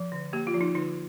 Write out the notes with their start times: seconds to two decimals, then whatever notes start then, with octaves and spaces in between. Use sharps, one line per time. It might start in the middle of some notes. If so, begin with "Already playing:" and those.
Already playing: F3
0.12 D3
0.33 A#3 G4
0.47 F4
0.54 F3
0.61 D#4
0.75 D3 D#4